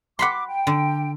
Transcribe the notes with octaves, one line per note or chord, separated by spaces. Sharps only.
F#5 B5 C6 D6
G5
D3